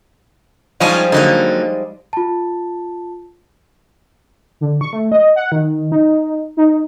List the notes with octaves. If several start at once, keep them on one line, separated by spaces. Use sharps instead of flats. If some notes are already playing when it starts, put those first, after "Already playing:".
F3 G3 G#3 C#4 D#4 F4
D3 F#3 A#3 D#4
F4 A5
D3
C#6
A3
D#5
F#5
D#3
D#4
D#4